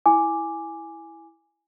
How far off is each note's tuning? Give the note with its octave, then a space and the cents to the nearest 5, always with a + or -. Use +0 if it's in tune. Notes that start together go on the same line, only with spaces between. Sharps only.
E4 +0 G#5 +0 D6 +0